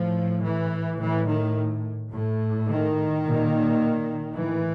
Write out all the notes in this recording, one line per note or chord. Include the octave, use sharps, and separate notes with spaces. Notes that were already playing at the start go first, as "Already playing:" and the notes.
Already playing: A2 F3
E3
A2 E3
D#3
A2
D#3
A#2
A2 E3